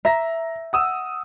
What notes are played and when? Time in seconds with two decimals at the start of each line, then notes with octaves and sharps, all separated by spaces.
0.05 E5 A#5 A#6
0.73 F#5 D#6 E6